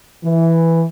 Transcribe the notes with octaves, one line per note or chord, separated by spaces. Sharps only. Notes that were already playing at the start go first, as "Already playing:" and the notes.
E3